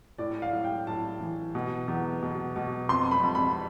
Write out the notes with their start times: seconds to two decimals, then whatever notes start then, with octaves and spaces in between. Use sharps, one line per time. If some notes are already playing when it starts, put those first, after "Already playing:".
0.18 A2 D5
0.42 F5
0.53 A2
0.64 G5
0.87 A2 A5
1.21 E3
1.55 B2
1.88 E2
2.22 B2
2.56 B2
2.89 F2 C6
3.11 B5
3.23 F2
3.35 B5